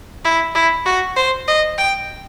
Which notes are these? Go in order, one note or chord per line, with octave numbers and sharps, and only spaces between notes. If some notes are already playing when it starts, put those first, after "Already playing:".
E4
E4
F#4
C5
D#5
G5